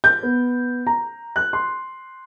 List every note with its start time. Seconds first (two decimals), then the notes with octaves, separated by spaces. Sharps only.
0.04 G6
0.23 B3
0.87 A#5
1.36 F#6
1.53 C6